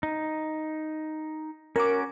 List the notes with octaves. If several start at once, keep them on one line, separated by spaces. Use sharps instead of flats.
D#4
C#4 F#4 A#4 D6